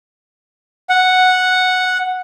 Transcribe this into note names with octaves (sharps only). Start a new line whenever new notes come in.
F#5